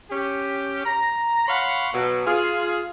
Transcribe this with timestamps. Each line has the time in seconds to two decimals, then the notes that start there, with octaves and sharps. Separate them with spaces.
0.11 C#4 G4
0.85 A#5
1.47 C#5 F5 F#5 B5 C6
1.94 B2 F#3
2.26 F4 G#4